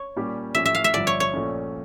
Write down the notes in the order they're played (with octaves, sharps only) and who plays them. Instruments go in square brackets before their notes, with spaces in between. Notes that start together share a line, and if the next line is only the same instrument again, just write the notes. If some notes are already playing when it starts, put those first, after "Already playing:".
Already playing: [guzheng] C#5
[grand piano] A#2 G3 A#3 C#4 G4
[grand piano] A2 F3 C#4 G4 [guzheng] E5
[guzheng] E5
F5
E5
[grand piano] G1 G2 F3 [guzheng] D5
[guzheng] C#5
C#5
[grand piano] A#1 A#2 A3 C#4